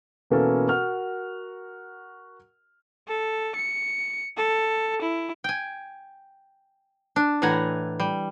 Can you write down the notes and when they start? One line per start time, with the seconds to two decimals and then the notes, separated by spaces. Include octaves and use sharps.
0.30 B2 E3 A#3 C#4 F#4 A4
0.68 F#4 A#4 F#5 F6
3.09 A4
3.56 C#7
4.38 A4
5.02 E4
5.44 G5 G#5
7.16 D4
7.42 A2 E3 F#5 G#5 A#5
8.00 G3